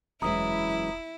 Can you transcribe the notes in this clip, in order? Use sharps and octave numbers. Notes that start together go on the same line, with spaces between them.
E1 F#2 E3 G#3 E4 A#5 D#6